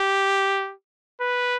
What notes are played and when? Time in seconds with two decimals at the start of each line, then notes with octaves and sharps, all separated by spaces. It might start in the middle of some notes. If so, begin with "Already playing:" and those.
Already playing: G4
1.21 B4